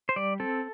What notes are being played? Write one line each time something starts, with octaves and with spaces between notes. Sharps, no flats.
C5
G3 D5
C4 A4